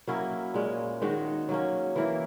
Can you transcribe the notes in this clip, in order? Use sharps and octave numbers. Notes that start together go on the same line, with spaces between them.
F#3 A#3 C#4 E4
A#2 G#3 C#4
D#3 G#3 D#4 F#4
F#3 A#3 C#4
E3 A#3 E4